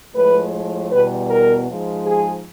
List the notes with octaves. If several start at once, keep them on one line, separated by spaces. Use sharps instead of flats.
A2 F3 G#3 B4
E2 B2 G3 B4
A#4
G#2 F3 G#3
G#4